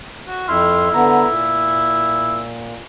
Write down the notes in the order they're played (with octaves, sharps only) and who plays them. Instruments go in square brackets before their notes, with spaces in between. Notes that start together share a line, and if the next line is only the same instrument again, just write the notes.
[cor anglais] F#4
[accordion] F2 C6 F6 [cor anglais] E4
[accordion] D3 B3 A#5
A#2